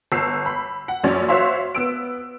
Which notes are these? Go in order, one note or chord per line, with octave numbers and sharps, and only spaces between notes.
G1 E6 C7
B5
F#5
A#1 F#2 C#4 D5
F#4 C5 C#5 E5 F5 C6
B3 E6 D7